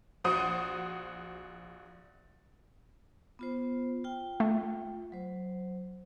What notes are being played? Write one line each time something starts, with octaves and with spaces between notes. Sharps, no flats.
A#1 F#4 C5 F#5 D#6 D#7
B3 F4 C5
F4 G5
A3
F#3 C5